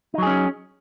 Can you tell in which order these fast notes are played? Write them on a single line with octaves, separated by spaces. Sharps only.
D#4 F#3 G#4 C#4